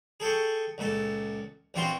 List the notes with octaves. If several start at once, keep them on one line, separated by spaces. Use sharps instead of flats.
G#4 A4 G5 C#6
C#2 A#2 A4
A#1 E3 C4 F4 F#4 C6